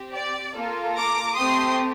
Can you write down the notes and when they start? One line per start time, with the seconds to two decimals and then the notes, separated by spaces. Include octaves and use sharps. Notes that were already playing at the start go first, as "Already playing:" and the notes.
Already playing: C4 G4
0.14 D5
0.55 A#3 F4 A4
0.95 A#5 D6
1.36 A3 C4 G4 C6 D#6